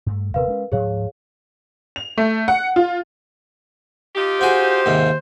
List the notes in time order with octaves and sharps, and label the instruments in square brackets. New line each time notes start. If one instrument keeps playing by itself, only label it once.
[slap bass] G2 A3
[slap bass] D#1 C3 B3 [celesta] A#4 B4 F5
[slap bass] G#3 C#4
[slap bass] D2 G#2 F3 [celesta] G#4 C#5 F5
[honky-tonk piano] F7
A3
F#5
F4
[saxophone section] D#4 F4 G4
[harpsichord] F#4 G#4 [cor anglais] C5
[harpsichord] D#2 G#2 C3